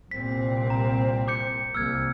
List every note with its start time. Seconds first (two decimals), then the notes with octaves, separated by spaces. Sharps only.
0.11 C2 A#2 C4 B6
0.70 A#5
1.28 D6 G6 C#7
1.75 C2 A#3 E6 F6 G#6